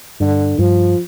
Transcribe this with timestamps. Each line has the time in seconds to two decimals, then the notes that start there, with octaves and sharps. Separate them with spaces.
0.20 G2 D3
0.58 G2 F3